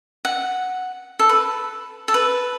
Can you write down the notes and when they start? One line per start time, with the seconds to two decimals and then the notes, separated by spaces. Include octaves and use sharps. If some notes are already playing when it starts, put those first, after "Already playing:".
0.25 F#5
1.19 A4
1.29 B4
2.08 A4
2.14 B4